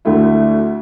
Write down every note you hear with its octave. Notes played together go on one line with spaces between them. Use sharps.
D2 D3 A3 E4